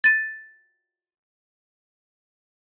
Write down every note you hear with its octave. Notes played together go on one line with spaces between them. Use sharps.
A6 D#7